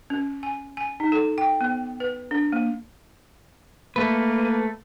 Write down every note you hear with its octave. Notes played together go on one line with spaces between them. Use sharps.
C#4
G#5
G#5
D#4
A4
G5
B3
B4
D4
A#3
A3 A#3 B4